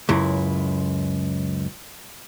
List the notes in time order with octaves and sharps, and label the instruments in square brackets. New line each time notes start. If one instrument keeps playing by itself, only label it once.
[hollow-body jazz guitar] C#2 F#2 E4